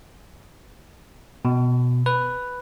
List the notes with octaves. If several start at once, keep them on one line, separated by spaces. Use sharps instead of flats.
B2
B4